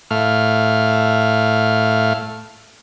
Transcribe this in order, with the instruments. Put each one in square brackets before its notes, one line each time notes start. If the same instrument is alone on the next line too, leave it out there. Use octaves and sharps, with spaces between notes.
[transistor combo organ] A2 A3 F5 F6